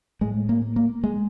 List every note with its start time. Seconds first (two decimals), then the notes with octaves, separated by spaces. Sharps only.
0.21 A2 G#3
0.49 A#3
0.76 A#3
1.04 G#3